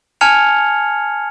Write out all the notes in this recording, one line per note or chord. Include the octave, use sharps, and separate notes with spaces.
G#5 A5 F6 G#6 C#7 F7